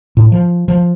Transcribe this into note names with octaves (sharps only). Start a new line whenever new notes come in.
A2
F3
F3